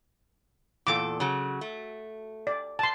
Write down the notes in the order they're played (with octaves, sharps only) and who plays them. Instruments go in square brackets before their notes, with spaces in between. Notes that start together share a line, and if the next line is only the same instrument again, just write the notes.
[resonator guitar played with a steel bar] E2 A#2 A4 [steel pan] D6
[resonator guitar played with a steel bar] C#3 F#3
A3
[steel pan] D5
A5 C6